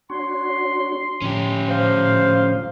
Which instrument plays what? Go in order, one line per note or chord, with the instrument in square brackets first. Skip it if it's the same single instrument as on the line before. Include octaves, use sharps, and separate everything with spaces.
[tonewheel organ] D4 F#4 C#5 [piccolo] C6
[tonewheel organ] A2 D3 F3 [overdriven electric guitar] C#4 G4
[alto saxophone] C5 [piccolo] F5